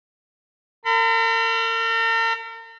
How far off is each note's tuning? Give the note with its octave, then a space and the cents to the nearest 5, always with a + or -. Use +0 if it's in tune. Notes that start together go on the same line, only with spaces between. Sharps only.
A#4 -40 B5 +35